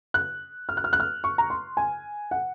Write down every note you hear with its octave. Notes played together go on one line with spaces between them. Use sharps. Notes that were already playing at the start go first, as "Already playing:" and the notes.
F#6
F6
F#6
F6
F#6
F6
C#6
A#5
C6
G#5
F#5